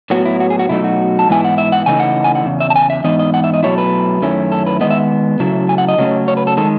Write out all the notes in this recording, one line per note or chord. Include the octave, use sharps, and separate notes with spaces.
A2 F#3 B3 F#4
E4
F#4
G#4
F#4
B2 F#3 A3 D#4 E4
F#4
A5
G#2 E3 B3 E4 G#5
F#5
E5
F#5
C#3 E3 A3 D#4 G#5
F#5
G#5
F#5
E2 C#3
E5
A5
G#5
E5
G#2 E3 B3 D#4 D#5
D#5
F#5
E5
D#5
B2 F#3 A3 E4 C#5
B4
F#2 D#3 A3 C#4 E4
A4
B4
D#3 G#3 B3 D#5
E5
C#3 F#3 A3 E4
G#5
F#5
D#5
C#3 F#3 A3 C#4
C#5
B4
A4
D#3 G#3 A4